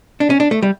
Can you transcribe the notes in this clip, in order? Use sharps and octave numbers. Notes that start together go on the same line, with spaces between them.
D4
C#4
D4
A3
G3